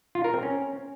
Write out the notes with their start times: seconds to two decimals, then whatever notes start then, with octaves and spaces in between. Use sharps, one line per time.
0.15 F4
0.24 A#4
0.34 C4
0.43 C#4